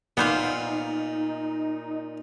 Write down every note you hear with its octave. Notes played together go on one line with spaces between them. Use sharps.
A#2 B3 D#4 C5 F5